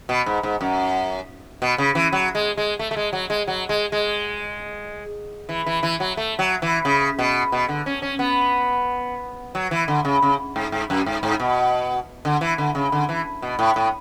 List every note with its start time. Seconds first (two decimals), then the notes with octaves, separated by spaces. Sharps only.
0.09 B2
0.26 G#2
0.43 G#2
0.61 F#2
1.62 B2
1.78 C#3
1.95 E3
2.13 F#3
2.35 G#3
2.57 G#3
2.79 A3
2.91 A3
2.96 G#3
3.13 F#3
3.30 G#3
3.47 F#3
3.69 G#3
3.92 G#3
5.49 E3
5.66 E3
5.83 E3
6.00 F#3
6.17 A3
6.39 F#3
6.62 E3
6.85 C#3
7.19 B2
7.52 B2
7.69 D3
7.86 C#4
8.02 C#4
8.19 B3
9.55 F#3
9.71 E3
9.88 D3
10.05 C#3
10.22 C#3
10.56 G#2
10.72 G#2
10.90 F#2
11.06 G#2
11.23 G#2
11.40 B2
12.25 D3
12.41 E3
12.58 D3
12.75 C#3
12.92 D3
13.09 E3
13.42 B2
13.59 A2
13.76 A2